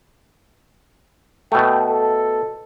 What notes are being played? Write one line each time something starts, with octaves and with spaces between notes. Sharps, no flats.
B2 A3 G5
A4